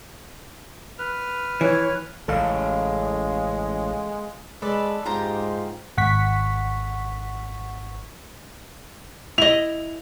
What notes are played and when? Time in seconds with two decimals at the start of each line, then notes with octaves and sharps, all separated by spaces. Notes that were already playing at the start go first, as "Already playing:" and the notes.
0.99 B4 F6
1.61 E3 C#5
2.28 A1 C#3 G#3 A4 F5
4.62 G#3 A4 B4 D5
5.05 G#2 F4 G4 A#5
5.97 G#1 F#5 C#6 B6
9.38 E4 D#5 F7